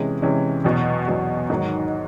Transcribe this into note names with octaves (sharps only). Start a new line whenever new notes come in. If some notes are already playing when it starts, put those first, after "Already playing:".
Already playing: C3 E3 G#3 C#4
C3 E3 G#3 C#4
E2 B2 F#3
E2 B2 F#3
G#2 D#3 F#3